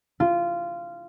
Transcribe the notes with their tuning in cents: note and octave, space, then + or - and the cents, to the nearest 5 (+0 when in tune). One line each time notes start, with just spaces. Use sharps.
F4 -15